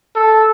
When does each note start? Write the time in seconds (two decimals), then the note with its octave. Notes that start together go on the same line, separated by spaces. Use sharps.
0.16 A4